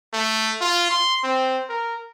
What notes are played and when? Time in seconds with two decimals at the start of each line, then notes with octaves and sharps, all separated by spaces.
0.13 A3
0.61 F4
0.91 C6
1.23 C4
1.69 A#4